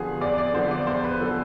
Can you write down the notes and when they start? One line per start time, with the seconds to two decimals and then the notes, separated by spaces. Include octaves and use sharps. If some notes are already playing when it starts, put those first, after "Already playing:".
Already playing: E2 D3 F3 B3 G#4
0.21 E2 D5
0.38 D5
0.54 D3 F3 B3 C5
0.71 D5
0.87 E2 C5
1.04 B4
1.20 D3 F3 B3 A4